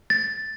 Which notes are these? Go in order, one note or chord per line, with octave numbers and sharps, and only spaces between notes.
A6